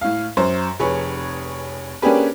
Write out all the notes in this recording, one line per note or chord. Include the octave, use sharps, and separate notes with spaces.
A2 F5
F#2 C5
F1 G#4 B4 C#5
A#3 C#4 D4 G4 G#4 B4